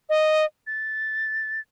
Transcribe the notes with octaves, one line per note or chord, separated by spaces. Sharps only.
D#5
A6